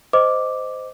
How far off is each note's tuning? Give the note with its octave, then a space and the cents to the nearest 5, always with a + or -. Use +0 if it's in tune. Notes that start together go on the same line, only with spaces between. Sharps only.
C5 -15 D#5 +0 D6 +0